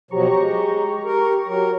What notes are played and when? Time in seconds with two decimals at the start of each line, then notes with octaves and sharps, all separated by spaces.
0.11 B2 F3 F#3 G4 A#5 C#6
0.37 G#3
1.05 A#4
1.46 F#3 A#4